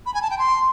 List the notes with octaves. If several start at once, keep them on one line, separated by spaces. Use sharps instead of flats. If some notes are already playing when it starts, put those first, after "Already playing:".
B5
G#5
A5
G5
C6